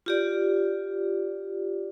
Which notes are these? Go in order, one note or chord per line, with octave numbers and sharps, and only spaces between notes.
F4 G4 D5